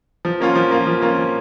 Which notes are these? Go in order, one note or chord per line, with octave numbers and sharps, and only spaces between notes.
F3
A#3 C#4 F4
F3
A#3 C#4 F4
F3
A#3 C#4 F4
F3